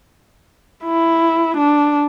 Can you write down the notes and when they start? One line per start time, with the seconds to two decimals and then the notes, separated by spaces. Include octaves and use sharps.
0.85 E4
1.57 D4